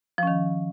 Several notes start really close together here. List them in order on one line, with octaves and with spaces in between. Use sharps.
F3 C#4 D#3